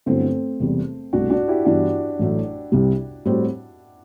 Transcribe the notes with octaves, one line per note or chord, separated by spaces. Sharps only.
G2 D3 F#3 A3 B3 C4 E4
E1 E2 C3 G3
C2 B2 A3 D4 F#4
D4 F#4
E4 G4
G2 E3 B3 D4 E4 F#4
A1 A2 F#3 A3
C2 C3 G3
A2 G3 C4 F#4